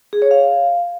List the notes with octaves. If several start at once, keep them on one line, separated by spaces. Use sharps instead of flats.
G#4
C#5
F5